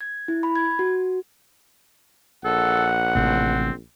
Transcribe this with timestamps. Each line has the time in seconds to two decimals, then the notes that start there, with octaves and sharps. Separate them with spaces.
0.01 G#6
0.28 E4
0.43 B5
0.56 G#6
0.79 F#4
2.45 A#1 A4 F#5
3.15 A1 A2 C3 C4